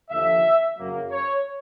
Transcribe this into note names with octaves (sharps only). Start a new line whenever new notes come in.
D#2 D3 F3 E5
F#2 C#3 F#3 A#3
C#5